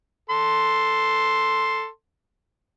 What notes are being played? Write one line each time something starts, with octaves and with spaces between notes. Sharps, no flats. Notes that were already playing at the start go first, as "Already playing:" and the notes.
A4 C6